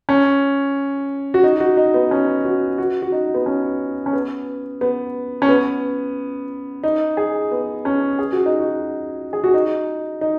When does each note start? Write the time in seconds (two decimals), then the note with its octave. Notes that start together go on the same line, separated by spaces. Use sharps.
0.09 C#4
1.34 F#4
1.44 D#4
1.60 F#4
1.77 D#4
1.94 B3
2.11 C#4
2.45 F#4
2.78 F#4
3.02 F#4
3.12 D#4
3.34 B3
3.46 C#4
4.06 C#4
4.13 B3
4.81 B3
5.42 C#4
5.49 B3
6.83 D#4
7.17 G#4
7.52 B3
7.85 C#4
8.19 G#4
8.33 F#4
8.46 D#4
8.60 F#4
9.33 G#4
9.44 F#4
9.54 D#4
10.21 D#4